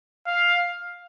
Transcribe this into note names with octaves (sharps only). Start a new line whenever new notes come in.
F5